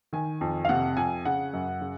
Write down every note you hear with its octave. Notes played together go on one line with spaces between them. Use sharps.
D#3 G#5
F2
F5
C3 F#5
F2 G#5
C#3 F#5
F#2
C#3